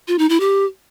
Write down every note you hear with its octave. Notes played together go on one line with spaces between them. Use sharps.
F4
D#4
E4
G4